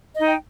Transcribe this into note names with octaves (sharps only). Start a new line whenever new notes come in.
D#4 D#5 G5